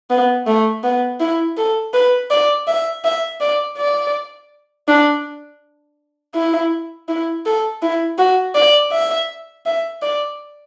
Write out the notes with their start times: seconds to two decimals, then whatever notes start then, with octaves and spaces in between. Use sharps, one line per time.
0.10 B3
0.47 A3
0.83 B3
1.20 E4
1.57 A4
1.93 B4
2.31 D5
2.68 E5
3.04 E5
3.41 D5
3.77 D5
4.88 D4
6.35 E4
7.08 E4
7.46 A4
7.82 E4
8.18 F#4
8.55 D5
8.92 E5
9.66 E5
10.02 D5